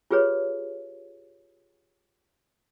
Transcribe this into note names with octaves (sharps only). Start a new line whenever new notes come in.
F4 G4 G#4 B4 C#5